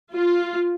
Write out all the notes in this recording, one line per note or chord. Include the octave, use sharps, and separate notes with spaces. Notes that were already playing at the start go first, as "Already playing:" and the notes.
F4